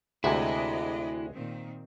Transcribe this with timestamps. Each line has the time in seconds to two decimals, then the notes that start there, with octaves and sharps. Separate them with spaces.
0.24 D2 C3 G#3 E4 F#4 G#4 D5 D#5
1.31 A#2 D#3 C4